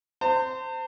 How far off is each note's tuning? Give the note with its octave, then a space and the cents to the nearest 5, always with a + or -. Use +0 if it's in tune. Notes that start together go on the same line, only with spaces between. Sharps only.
C5 -20 A5 +45